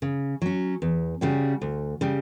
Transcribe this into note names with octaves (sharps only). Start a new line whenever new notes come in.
C#3
F#3 C#4
E2
C#3 G3 C#4 F#4
D2
C#3 G3